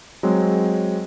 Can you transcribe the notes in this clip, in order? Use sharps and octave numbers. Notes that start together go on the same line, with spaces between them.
F#3 G#3 C4